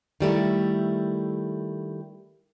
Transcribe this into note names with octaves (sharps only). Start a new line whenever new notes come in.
D#3 G3 A3 E4